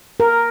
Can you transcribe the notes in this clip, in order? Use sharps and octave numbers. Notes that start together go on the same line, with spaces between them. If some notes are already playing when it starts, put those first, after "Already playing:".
A#4